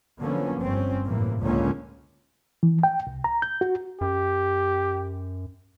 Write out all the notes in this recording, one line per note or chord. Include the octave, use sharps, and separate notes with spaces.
D3 F3 F#3 A#3 B3 C#4
G1 G2 C4 C#4
F#2 A2 C3 E3 A#3
C#2 D3 F3 A#3 C#4
E3
G5
C2
A#5
G6
F#4
F#2 G4